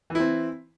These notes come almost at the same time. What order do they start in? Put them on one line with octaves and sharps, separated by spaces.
E3 E4 C4